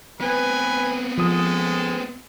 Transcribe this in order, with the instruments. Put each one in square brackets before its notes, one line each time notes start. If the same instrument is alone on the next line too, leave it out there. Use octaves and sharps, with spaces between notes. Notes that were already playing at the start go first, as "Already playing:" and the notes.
[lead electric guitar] B3 C4 [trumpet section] B4 G#5
[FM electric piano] F3 D#6 [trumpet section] G#3 A4